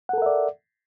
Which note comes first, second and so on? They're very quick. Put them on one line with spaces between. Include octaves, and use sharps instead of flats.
F#5 A4 A#4 E5 D5